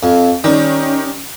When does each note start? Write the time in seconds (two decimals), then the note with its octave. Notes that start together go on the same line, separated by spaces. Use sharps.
0.03 F2
0.44 D#3 G3 C#4